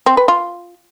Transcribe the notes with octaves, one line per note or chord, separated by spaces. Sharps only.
C4
B4
F4